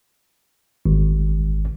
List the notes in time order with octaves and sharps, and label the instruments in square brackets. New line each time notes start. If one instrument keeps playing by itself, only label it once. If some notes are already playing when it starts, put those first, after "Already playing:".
[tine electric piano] G#1